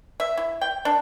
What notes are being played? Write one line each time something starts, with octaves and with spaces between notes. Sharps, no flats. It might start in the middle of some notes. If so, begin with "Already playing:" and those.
E5
E4
G5
D4